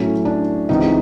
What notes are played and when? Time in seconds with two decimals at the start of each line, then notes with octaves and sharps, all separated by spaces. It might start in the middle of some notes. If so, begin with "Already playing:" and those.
Already playing: A2 F#3 A3 C#4
0.25 D4
0.69 C#2 C3 E3 D#4